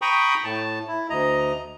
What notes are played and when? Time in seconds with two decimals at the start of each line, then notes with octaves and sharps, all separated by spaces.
0.02 G5 A#5 B5 C#6 D#6
0.44 A2 A5
0.87 E4
1.10 D2 D#5 A#5